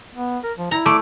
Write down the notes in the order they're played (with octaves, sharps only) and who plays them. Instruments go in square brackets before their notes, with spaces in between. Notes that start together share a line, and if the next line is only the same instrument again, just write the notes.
[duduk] B3
A#4
F3
[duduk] E4 [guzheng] A#5
[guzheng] A3 [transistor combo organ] D6